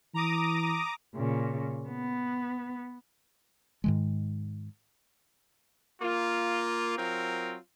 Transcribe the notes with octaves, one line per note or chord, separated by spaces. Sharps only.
E3 A#5 D6 D#6
A#2 C#3
B3
G#2 D#3 G#3
A#3 F4
F#3 C4 F4 A#4